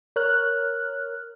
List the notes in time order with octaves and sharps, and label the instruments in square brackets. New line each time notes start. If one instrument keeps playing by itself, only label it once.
[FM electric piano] A#4 C#5 F6 F#6